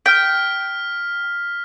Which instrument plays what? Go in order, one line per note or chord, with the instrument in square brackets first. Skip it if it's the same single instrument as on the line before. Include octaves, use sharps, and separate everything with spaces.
[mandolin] G5 [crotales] F6 B6